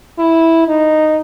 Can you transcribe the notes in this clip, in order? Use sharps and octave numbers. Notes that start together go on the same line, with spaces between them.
E4
D#4